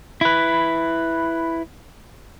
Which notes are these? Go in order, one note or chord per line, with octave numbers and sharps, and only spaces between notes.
E4 B4